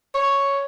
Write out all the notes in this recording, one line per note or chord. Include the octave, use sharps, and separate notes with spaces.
C#5